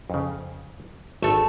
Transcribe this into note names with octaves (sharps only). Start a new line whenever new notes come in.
F2 C#3
G#1 A3 A4